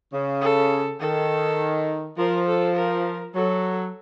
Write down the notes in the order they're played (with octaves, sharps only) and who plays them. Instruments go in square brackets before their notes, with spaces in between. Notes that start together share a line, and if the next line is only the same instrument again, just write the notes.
[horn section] C#3
[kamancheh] A4
[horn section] D#3 [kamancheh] A4
[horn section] F3 [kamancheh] A#4
[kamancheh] A4
A#4
[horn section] F#3 [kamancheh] A4